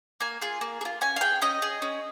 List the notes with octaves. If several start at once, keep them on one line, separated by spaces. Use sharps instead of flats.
A#3 G#5
F4 G#4
A#3
G#4
F4
C#4 G#5
F5
G#4 G5
C#4 D#5
G#4
C#4